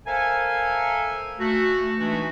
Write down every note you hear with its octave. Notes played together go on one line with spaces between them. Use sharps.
A4 A#4 C5 E5 F5 G#5
A3 F#4
E3 G#3 A3 D4 D#4 F#4